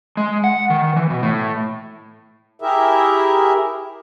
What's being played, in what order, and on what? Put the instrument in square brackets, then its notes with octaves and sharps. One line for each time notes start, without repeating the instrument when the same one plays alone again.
[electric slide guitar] G#3
F#5
D#3
E3
B2
A2
[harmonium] E4 G4 G#4 A#4 E5